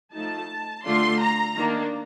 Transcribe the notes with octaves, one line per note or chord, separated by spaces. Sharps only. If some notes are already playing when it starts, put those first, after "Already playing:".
F3 A3 D#4 A5
D3 A3 D4 F4 C6
A#5
D#3 A#3 D4